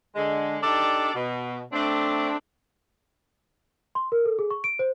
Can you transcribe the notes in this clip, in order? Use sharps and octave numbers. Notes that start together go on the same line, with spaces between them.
D3 G#3
D4 D#4 G4 A4 D5
B2
A3 C4 D4
C6
A#4
A4
G#4
C#6
D7
C5